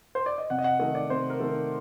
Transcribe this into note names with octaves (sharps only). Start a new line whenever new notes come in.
C5
D5
D#5
C3 F#5
D#5
F#5
D#3 A3 D#5
D5
C3 C5
A#4
D#3 A3